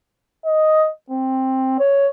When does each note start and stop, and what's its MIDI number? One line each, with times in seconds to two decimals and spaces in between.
0.46 0.89 75
1.10 1.77 60
1.79 2.08 73